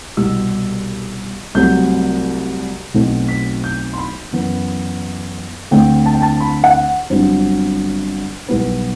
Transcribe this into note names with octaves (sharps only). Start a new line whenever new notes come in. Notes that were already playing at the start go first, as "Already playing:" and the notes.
C2 B2 G3 E6
C2 C3 F#3 A3 C4 G6
B1 B2 A3 C4
B6
G6
C6
B5
F#2 E3 B3
D2 D3 A3 C4 G5
A5
G5
A5
B5
F#5
G1 G2 F#3 C4 C5
B1 B2 G3 B3 B4